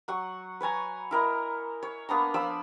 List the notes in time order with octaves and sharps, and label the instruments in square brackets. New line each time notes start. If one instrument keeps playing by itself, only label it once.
[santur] F#3 F#5 C#6
B4 C#5 G#5 A#5
E4 A#4 D#5
C#5
A#3 B3 D4 A#5
F3 D5 B5 E6